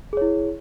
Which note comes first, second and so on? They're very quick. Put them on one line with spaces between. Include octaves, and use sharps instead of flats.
G#4 C#5 E4